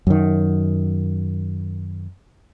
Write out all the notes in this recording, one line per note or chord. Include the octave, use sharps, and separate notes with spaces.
F#2 D#3